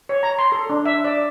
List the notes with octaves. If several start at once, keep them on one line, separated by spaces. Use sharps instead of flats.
C#5
A#5
C6
A4
D4
E5
D5